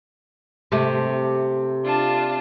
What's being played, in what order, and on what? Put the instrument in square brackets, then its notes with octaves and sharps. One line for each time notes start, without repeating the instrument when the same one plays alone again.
[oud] C3 A3
[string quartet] D4 F4 A5